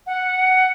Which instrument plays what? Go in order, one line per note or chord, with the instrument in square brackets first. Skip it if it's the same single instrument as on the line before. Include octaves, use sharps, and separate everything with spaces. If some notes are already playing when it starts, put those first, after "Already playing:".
[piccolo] F#5